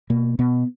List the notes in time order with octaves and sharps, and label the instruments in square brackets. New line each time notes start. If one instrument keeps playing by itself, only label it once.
[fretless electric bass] B2 A#3
B2 B3